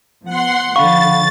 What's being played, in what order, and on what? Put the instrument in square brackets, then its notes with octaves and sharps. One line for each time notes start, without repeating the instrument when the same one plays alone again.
[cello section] F3 B3 [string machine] F#5 C6
[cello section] D3 F3 [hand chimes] F5 F#5 B5 [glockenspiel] C#6 [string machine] A6